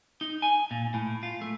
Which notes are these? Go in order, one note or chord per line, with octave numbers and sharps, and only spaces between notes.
D#4
G#5
A#2
A2
F4
A3